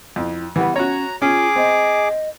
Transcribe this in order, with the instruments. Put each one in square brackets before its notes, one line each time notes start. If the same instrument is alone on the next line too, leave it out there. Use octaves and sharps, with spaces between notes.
[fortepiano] F2 [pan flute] E4
[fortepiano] E3 G3 B3 [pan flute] F#5
[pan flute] C#4 [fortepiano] F#4 C#5 [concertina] A#5
[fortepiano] C#4 [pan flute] F4 [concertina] G#4 D6
[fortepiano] C4 [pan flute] D#5